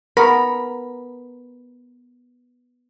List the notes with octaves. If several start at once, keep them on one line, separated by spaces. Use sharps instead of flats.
B3 A#4 B5